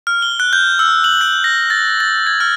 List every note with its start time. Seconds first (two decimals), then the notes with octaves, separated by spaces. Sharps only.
0.07 F6
0.22 G7
0.40 F#6
0.53 G6
0.79 E6
1.04 F#7
1.21 F#6
1.44 A#6
1.70 A6
2.00 A6
2.27 G#6
2.40 F6